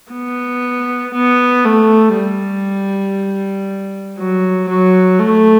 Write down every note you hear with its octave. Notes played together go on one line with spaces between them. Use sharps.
B3
B3
A3
G3
F#3
F#3
A3